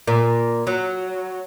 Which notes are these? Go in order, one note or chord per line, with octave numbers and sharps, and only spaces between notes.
A#2
F#3